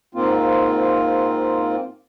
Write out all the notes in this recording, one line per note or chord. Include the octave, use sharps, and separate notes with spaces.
G#2 A#3 C4 F4